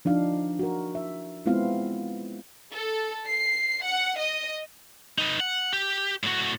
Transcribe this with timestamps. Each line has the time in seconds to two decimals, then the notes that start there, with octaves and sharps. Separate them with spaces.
0.05 F3 D4 D#4 F5
0.59 F#4 A#4
0.95 E5
1.46 G#3 B3 C4 E4 F4 F5
2.73 A4
3.27 C7
3.85 F#5
4.19 D#5
5.18 D#4 B4
5.40 F#5
5.73 G4
6.24 A2 F#4